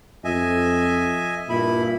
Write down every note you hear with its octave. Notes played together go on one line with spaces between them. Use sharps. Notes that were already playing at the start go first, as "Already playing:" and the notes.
F2 D#5 E5 G#5
G2 A#2 E4 B5